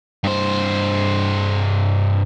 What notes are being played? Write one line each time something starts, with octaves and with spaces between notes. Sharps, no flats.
G2 C5